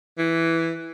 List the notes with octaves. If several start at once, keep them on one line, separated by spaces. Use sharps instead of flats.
E3